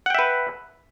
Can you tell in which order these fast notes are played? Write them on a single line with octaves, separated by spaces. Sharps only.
F#5 G5 E5 B4